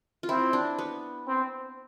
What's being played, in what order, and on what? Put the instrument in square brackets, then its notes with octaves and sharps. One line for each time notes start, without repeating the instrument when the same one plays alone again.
[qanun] F4
[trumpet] C4 [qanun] E4
[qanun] D4
B3
[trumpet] C4